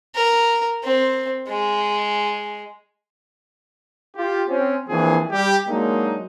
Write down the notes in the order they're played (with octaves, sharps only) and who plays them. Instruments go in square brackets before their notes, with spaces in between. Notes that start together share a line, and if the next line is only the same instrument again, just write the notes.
[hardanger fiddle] A#4
C4
G#3
[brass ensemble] F4 G4
C4 C#4
E3 F3 A#3 C4 D4 G#4
G3 G4
F#3 G#3 A#3 D4 D#4